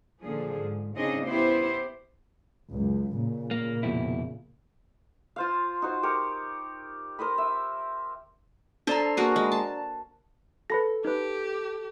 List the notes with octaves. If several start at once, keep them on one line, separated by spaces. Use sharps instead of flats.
A#2 D3 F3 G#4
G#2
C#3 C4 D4 D#4 G#4 D#5
B3 E4 G4 C5
C#2 F#2
A#2 C#3
A#3
F2 B2 E4
F4 C5 F5
D#4 F#4 C5
G4 A#4 C#6
A#4 C5 D#5 B5
E5
D4 A4 C5 D5 A#5
A#3 F#4 G#4
G#3
A5
A4 B4 B5 A#6
D#4 G4 B4